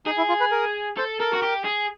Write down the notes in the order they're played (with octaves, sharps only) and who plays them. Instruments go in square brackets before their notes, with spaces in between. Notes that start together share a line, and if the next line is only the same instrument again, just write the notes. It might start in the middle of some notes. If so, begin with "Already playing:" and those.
[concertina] D#4 [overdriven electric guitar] G#4
[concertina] E4
F4
B4
A#4
[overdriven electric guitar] A4 [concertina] C5
[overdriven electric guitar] A4 [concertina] A#4
[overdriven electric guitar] F#4
G4
G#4